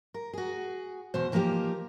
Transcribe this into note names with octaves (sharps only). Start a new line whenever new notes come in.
A#4
F#4 G#4
E2 B2 C5
E3 F3 A#3 D#4 G4 A#4